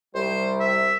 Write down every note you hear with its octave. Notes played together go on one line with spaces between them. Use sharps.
C2 G3 C5
E5